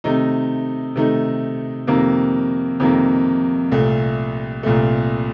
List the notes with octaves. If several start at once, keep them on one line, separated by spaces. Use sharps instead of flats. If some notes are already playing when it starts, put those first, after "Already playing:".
C3 D#3 A3 D#4
C3 D#3 A3 D#4
F2 C3 D#3 A#3
F2 C3 D#3 A#3
C2 A#2 A3
C2 A#2 A3